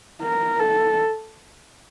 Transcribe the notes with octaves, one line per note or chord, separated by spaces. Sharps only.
A#4
A4